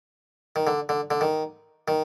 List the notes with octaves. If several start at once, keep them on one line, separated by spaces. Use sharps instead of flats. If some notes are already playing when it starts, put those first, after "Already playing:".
D#3
D3
D3
D3
D#3
D#3